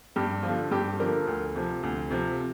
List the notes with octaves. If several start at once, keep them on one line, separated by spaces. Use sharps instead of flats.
G2 G4
F3 F4
D3
G2 G4
D3 F3 A#4
D2
C3 F3
D2
C3 F3